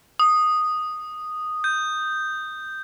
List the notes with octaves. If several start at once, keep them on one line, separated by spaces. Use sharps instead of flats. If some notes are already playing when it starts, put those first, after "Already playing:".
D#6
G6